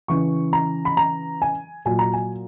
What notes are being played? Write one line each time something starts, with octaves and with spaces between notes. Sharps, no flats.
C#3 E3 C#6
A#5
B5
A#5
G#5
A#2 F#3 G#5
A#5
G#5